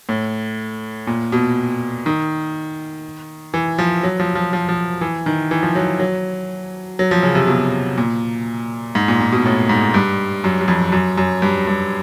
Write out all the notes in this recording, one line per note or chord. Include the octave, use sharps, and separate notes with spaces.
A2
A#2
B2
D#3
E3
F3
F#3
F3
F3
F3
F3
E3
D#3
E3
F3
F#3
F#3
F#3
F3
C#3
C3
B2
A#2
G#2
A#2
A#2
B2
A2
G#2
G2
F#2
F#2
F2
F#2
F#2
G2
G2